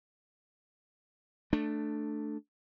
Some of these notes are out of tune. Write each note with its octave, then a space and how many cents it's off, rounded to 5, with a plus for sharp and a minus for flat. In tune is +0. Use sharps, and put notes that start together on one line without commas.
A3 +0 D4 +10